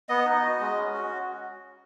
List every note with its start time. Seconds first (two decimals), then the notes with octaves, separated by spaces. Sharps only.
0.09 B3 D#5
0.26 D#4
0.43 F#4
0.60 G#3
0.76 C#4
0.94 F#4